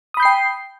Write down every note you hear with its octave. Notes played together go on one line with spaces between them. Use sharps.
G5 B5 D#6 G6 C7